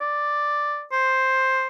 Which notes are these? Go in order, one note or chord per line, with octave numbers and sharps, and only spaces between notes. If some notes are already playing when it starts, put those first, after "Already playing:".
D5
C5